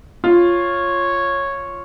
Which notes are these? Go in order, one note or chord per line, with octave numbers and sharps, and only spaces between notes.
F4 C#5